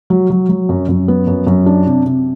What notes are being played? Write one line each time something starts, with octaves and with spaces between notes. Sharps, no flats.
F#3
F#3
F#3
F#2
F#2
B3
F#2
F#2
D4
C3
C3